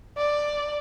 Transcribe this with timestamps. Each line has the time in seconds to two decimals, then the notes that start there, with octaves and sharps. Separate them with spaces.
0.17 D5